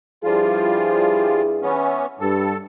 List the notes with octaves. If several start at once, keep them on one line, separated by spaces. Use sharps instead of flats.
G2 F3 G3 E4 F4 G#4
E3 B3 C#4
G2 A4